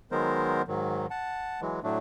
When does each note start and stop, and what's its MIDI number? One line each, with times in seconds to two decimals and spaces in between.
0.12 0.62 51
0.12 0.62 54
0.12 0.62 56
0.12 0.62 59
0.12 0.62 70
0.12 0.62 72
0.68 1.06 44
0.68 1.06 51
0.68 1.06 54
1.10 1.61 78
1.10 1.61 81
1.61 1.80 52
1.61 1.80 54
1.61 1.80 56
1.83 1.98 45
1.83 1.98 54
1.83 1.98 57
1.83 1.98 62